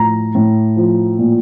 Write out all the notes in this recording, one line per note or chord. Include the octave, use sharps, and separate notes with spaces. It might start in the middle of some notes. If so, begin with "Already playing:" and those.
Already playing: A2 F3 A#5
A2
F3
A#2